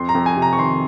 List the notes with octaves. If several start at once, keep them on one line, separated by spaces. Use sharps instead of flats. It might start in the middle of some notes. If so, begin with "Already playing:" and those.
Already playing: F2 C6
A#5
F2
G#5
C3
A#5
C#6
D#3 C6